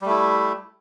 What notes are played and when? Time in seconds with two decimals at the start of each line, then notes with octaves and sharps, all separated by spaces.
0.02 G3
0.05 A3
0.09 E4